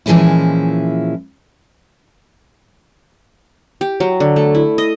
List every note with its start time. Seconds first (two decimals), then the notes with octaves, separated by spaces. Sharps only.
0.06 A#2 E3 F3 G#3 C#4 E4
3.81 G4
4.00 F#3
4.20 D3
4.36 A3
4.55 E4
4.78 D#5